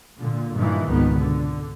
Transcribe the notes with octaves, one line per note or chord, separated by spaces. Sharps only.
A#2 D3
G2 A#2 D#3 E3
G#1 C#2 G#2 B2 D#3 B3
D3